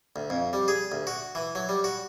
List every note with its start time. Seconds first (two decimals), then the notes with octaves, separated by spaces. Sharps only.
0.16 D2
0.30 F2
0.53 G3
0.68 G#4
0.92 D2
1.07 F#4
1.35 E3
1.55 F#3
1.69 G3
1.84 F#4